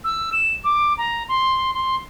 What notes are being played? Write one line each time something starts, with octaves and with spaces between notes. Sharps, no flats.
E6
E7
D6
A#5
C6
C6